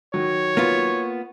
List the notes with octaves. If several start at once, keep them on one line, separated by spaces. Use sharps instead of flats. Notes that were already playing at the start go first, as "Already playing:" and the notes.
D#3 F#3 C#5
A#3 B3 F4